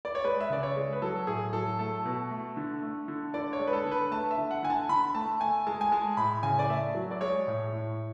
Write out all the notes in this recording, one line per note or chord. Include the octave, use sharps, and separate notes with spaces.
D5
C#5
G#3 B4
E5
C#3 D5
C#5
G#3
B4
F#3 A4
A2 G#4
F#3 A4
A3 A4
B2
A3
D3
A3
D3
D3 D5
C#5
G#3
B4
A4
D3
B4
A3 A5
E5
D3
F#5
D3 G#5
A5
D3 B5
A3 A5
A3 G#5
G#3 A5
G#5
G#3 A5
A2 B5
C#3 G#5
D5
A3 E5
F#3
D5
G#3 C#5
A2
A2